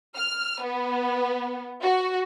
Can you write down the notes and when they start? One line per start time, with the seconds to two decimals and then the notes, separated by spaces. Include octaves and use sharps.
0.16 F6
0.64 B3
1.83 F#4